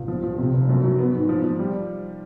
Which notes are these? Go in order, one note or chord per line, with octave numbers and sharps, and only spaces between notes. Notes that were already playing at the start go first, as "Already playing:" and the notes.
Already playing: C#2
F3
F3
C3
F1
F#2
F#3
B3
G#2
F3
F3
G3